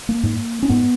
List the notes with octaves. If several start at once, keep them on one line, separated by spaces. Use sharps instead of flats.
A#3
G#2
C#4
G#2 B3